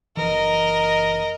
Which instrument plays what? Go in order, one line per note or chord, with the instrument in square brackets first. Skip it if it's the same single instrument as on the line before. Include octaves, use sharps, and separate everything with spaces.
[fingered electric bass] F#1 E3 [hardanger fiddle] A#4 D#5